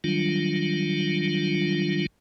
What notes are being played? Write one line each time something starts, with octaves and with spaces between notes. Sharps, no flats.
D#3 F#3 G3 D4 F4